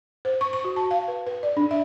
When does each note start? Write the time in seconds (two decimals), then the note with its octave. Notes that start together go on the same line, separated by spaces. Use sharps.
0.25 C5
0.41 C#6
0.53 C#6
0.65 F#4
0.76 A5
0.91 F5
1.08 B4
1.27 B4
1.43 D5
1.57 D4
1.71 E5